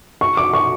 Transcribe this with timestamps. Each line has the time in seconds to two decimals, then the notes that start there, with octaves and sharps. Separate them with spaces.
0.21 C#6
0.37 D6
0.53 C#6